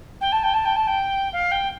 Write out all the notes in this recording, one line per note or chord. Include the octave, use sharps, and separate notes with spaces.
G5
A5
G5
A5
G5
A5
G5
F5
G5